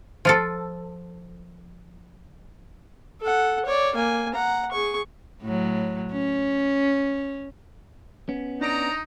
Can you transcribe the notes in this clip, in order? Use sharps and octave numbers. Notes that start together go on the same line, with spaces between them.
F3 F4 A4
A4 F#5
C#5 D5
A#3 G#5
F#5 A#5
G#4 C#6
A2 F#3
C#4
B3 C#4
D4 D#4 D5 A#5 A#6 D7